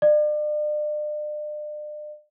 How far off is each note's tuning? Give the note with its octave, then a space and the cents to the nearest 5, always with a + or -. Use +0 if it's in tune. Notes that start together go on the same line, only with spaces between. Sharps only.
D5 +40